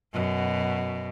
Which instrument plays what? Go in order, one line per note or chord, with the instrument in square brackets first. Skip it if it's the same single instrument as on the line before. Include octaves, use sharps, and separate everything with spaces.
[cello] F#2 B2